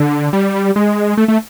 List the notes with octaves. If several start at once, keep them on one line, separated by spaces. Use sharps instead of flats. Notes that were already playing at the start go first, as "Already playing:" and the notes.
Already playing: D3
G3
G#3
A3
A3